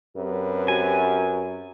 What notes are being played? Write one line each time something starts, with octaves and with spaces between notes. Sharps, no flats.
F#2 C4 G4 B4
F#4 G#5